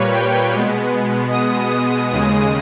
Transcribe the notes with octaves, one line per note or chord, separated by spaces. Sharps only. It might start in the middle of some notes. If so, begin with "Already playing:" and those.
Already playing: A#2 G3 A#3 B4 C#5
G5
B2 G#3 B3
D#6
D#2 C#3 G#3